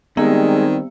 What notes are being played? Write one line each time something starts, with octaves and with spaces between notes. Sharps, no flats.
D#3 G3 G#3 B3 C4